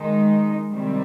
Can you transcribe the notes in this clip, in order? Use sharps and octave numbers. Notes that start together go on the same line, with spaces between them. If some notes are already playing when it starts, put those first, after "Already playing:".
Already playing: D#3 G#3 D#4
C3 D#3 G3 C4